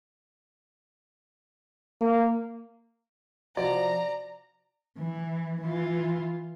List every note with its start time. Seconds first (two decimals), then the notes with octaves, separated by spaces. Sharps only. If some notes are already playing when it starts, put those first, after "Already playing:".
2.01 A#3
3.57 C3 F3 F#4 D5 A#5
4.97 E3
5.62 E3 F4